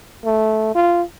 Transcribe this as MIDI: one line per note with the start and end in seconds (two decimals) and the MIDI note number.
0.25 0.75 57
0.75 1.03 65